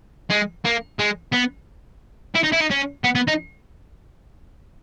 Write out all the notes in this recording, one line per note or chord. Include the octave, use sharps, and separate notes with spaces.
G#3
A#3
G#3
B3
E4
D#4
E4
D#4
C#4
B3
B3
D#4